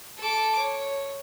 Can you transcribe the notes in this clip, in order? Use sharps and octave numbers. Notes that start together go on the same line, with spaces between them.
A4 D6
C#5